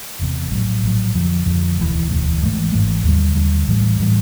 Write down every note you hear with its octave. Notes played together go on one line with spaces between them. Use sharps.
F#1 E2 C3
A#1 A2 F#3
A#1 A2 F#3
F2 D3 F3
F2 D3 F3
E1 D2 C#3 E3
E1 D2 C#3 E3
G#1 G#2 E3 A3
G#1 G#2 E3 A3
D#2 D3 G3
D#2 D3 G3
A#1 A2 E3 G3
A2 E3 G3